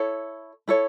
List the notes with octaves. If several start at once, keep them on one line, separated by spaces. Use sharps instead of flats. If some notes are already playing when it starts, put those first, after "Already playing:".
Already playing: E4 A4 C#5
E4 A4 C#5